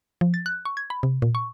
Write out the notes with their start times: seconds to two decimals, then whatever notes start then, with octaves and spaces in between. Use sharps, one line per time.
0.21 F3
0.34 A6
0.46 F#6
0.65 C#6
0.77 G#6
0.90 B5
1.03 C3
1.22 A#2
1.35 C#6